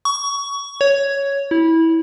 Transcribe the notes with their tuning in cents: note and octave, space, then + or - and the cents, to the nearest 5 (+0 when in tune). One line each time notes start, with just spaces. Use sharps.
C#6 +20
C#5 +5
E4 -20